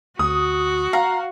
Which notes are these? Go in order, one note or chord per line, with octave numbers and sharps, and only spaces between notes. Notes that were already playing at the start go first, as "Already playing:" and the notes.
D2 F#4 D#6
F5 F#5 A#5